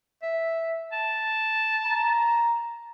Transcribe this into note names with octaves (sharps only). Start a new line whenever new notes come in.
E5
A5
A#5